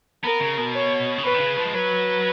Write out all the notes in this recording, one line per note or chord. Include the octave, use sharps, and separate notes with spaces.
B3 A#4
C#3
B2
C#5
C#3
B2 B4
D#3
C#3
F3
G#3
F#3 B4